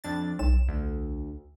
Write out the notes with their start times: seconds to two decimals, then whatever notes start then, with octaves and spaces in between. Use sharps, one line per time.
0.04 F2 D4 A6
0.39 B1 E7
0.68 D2